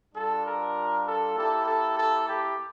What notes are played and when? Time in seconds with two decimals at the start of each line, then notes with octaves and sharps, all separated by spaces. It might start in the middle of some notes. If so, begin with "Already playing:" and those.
0.14 G3 D4 F4 A4
0.44 A#4
1.05 A4
1.35 A#3 E4 G4 A4
1.65 A4
1.95 A4
2.25 G4